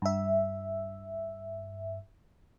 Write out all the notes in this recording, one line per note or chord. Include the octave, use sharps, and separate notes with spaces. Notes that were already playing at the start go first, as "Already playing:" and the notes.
G2 E5